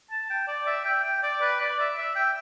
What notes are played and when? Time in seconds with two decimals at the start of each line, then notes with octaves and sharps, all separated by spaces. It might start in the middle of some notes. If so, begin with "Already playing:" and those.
0.11 A5
0.30 G5
0.48 D5
0.67 E5
0.85 G5
1.04 G5
1.23 D5
1.42 B4
1.61 D5
1.80 E5
1.98 E5
2.16 G5